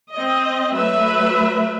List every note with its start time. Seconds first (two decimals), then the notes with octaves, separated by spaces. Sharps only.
0.14 C4 D#5
0.72 F#3 A3 B4 E5